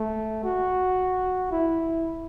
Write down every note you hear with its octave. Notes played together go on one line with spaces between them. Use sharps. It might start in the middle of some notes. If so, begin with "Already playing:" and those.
Already playing: A3
F#4
E4